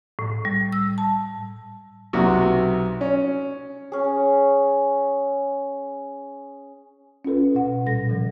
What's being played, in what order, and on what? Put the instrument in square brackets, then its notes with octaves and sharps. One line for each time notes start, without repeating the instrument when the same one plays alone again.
[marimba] A2
G3
E6
A5
[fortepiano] B1 C3 F#4
C#4
[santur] C#4 G#4
[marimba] C#4 F4 A4 B4
B2 F#5
A#2 G3 A4 A#6
C#3 E3 F3 G3